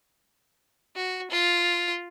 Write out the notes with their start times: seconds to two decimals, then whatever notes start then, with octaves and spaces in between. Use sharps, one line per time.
0.96 F#4
1.30 F4